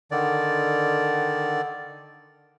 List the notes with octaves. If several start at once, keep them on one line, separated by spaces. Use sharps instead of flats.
D3 D#3 D5